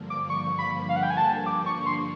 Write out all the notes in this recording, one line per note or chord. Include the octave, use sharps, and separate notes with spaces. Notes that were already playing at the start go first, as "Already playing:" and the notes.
Already playing: G2 D3 F3 A#3
D6
C#6
B5
F5
F#5
G5
G#5
A5
D6
C#6
C6